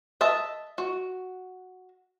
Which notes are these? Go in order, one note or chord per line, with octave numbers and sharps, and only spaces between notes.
D#5 E5 A5
F#4